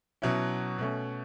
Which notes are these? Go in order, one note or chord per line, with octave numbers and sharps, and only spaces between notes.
B2 F#3 C#4 E4
B2 A3 C#4